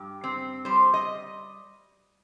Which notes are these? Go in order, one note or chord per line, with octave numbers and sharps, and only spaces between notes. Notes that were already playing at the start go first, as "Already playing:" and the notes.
Already playing: G2 G4
C4
G3 C5
D#5